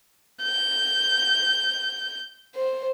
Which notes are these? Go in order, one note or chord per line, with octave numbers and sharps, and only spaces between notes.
G6
C5